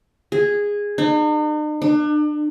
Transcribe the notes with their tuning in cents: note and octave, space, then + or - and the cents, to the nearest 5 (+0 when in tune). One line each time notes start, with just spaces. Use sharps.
G#4 -10
D#4 -45
D4 +35